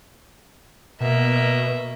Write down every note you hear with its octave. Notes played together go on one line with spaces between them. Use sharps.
B2 A#3 E5